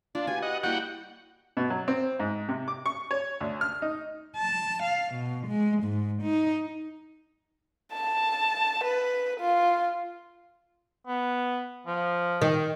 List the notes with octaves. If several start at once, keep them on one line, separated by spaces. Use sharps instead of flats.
D4 F4
F#4 G4 B4 G#5
D#5 F#5
G3 A#3 E4 F#4 F#5 G5
B2
F#3
C4
G#2
C3
D6
C#6
C#5
D2
F6
D#4
A5
F5
B2
G#3
G#2
D#4
A5
B4
F4
B3
F3
D#3